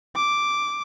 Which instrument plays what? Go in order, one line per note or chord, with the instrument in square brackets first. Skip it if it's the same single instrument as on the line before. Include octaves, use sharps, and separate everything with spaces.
[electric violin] D6